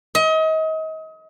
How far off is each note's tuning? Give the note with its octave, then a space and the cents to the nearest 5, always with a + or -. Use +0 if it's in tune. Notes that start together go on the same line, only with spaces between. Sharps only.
D#5 +35